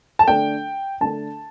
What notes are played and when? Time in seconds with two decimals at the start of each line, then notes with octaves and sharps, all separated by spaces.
0.19 A5
0.28 D3 A3 D4 G5
1.01 D3 A3 D4 A5